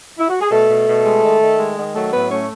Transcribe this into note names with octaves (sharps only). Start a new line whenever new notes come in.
E4
F#4
G#4
B2 A3 A4
B2
B2
G#3
D#3
D#3
G#3
D#3
F#3 A3 A4
A2 B3 B4
A3 C#4 C#5